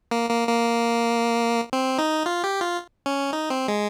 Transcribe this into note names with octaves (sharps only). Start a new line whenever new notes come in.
A#3
A#3
A#3
C4
D#4
F4
G4
F4
C#4
D#4
C4
G#3